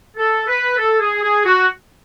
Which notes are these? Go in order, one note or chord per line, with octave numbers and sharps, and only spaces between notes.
A4
B4
A4
G#4
G#4
F#4